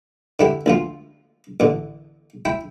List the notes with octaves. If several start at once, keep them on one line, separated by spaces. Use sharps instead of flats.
D3 E4 G4
D2 F3 F4
A1 D3
E4 G5